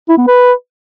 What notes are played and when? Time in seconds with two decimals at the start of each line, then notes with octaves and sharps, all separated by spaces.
0.09 E4
0.18 B3
0.27 B4